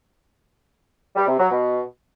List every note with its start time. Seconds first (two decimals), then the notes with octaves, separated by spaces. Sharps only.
1.16 G3
1.28 C3
1.39 F#3
1.51 B2